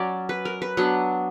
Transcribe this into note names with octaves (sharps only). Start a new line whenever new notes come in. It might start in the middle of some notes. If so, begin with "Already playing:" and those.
Already playing: F#3 C#4 D5
B4
A#4
B4
F#3 B3 D4 F#5